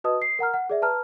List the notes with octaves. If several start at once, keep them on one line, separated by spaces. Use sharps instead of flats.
F#4 B4 D#5 A5 D#6
C7
A#4 F#5 A#5 F6
F#5
G#4 D5 E5
B4 A5 A#5 F6